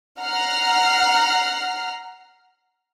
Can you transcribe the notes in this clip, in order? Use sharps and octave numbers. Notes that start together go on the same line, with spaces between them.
F#5 A#5 F6 C7